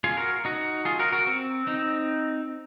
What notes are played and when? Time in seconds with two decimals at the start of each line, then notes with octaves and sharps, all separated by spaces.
0.04 F4 G#4
0.17 F#4 A#4
0.45 D#4 F#4
0.85 F4 G#4
0.99 F#4 A#4
1.12 F#4 A#4
1.27 C4
1.67 C4 D#4